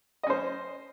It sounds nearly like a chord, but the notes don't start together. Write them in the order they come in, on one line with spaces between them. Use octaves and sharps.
D#5 C#4 C5